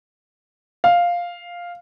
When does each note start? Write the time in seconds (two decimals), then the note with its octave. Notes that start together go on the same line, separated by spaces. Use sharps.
0.84 F5